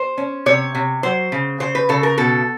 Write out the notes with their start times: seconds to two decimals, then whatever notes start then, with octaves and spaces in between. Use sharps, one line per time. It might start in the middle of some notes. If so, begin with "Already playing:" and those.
Already playing: C5
0.18 C#4
0.46 C3 C#5
0.75 C3
1.03 F#3 C5
1.32 C#3
1.60 C#3 C5
1.75 B4
1.89 C#3 A4
2.03 A#4
2.18 B2 A4